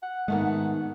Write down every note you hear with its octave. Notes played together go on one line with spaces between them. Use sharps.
F#5
G#2 D#3 G#3 A3 B3 F#5